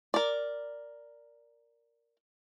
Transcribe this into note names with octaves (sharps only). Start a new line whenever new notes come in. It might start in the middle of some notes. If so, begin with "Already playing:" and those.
A#4 D5